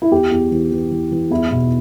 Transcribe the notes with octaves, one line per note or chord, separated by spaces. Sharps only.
E4
E2 G4
E2
E3
E3
E3
E3
E2 E4
B2